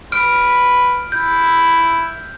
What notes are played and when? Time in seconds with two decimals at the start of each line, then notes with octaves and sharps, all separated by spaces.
0.12 B4 F6 D7
1.12 E4 G6